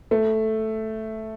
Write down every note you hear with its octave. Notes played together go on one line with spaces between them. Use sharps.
A3